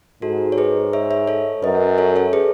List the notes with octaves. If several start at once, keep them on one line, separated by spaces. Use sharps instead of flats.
G#2 F#4 A4
C#5
G#4 B4
C#5 E5
C#5 E5
A4 C#5
F#2 B4 D#5
A4 C#5
A4 C#5
G#4 B4